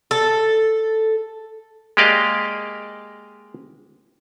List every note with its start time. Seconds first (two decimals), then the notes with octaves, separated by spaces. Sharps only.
0.11 A4
1.97 G#3 A#3 G4 D5 D#5 F5